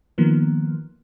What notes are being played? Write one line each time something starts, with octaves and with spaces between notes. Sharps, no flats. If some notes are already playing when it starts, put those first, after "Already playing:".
D#3 F3 A#3 B3